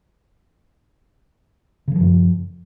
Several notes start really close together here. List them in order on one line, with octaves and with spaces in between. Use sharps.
C#3 E3 F3 F#2